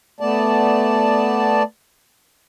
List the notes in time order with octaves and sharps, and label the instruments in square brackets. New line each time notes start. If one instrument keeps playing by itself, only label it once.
[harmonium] A3 B3 D5 A5